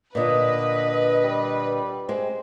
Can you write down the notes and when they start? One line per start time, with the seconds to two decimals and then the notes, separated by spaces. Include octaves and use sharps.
0.15 A#2 D3 B4 D#5
1.24 G3
2.09 G#3 C4 C5